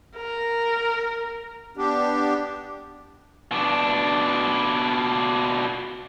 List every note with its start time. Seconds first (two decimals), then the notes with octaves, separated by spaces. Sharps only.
0.17 A#4
1.77 B3 D4 G4
3.52 B2 D4